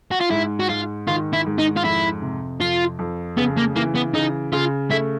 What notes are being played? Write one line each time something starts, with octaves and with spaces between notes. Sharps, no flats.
F#4
F4
G#2 E4
F#4
G#2 F4
D#3 F4
E4
G#2
D#4
F4
F2 E4
C3
F2 F4
F2
C#3 B3
A#3
E3 A#3
B3
C#3 D#4
C#3 F4
A3 E4